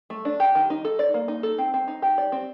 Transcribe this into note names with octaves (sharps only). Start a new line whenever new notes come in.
A3
D4
G4
D#3
D#4
A4
D5
A#3
D#4
A4
C4
C4
D#4
G4
D5
C4